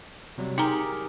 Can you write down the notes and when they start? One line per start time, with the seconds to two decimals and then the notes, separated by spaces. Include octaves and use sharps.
0.38 C3 F#3 G3
0.58 D#4 G4 G#4 A#4 A#5